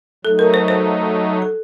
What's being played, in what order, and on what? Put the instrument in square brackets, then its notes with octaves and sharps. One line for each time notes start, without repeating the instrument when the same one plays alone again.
[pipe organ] F#3 A3 D#4 [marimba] A4
[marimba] A#4
C5
C5
A4